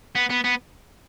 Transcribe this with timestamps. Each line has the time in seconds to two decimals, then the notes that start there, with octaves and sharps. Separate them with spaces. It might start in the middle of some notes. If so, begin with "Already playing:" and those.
0.16 B3
0.30 B3
0.44 B3